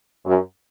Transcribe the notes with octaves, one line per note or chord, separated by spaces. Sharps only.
F#2